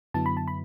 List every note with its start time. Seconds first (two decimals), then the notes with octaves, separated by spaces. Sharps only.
0.14 F#2 D3 F#3 B3 E4 A5
0.26 B5
0.37 A5
0.48 B5